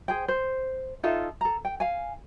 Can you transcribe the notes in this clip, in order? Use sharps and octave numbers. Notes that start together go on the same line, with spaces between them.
G#4 C5 G5
C5
D#4 F4 A4 E5
A4 A#5
G5
F5 G#5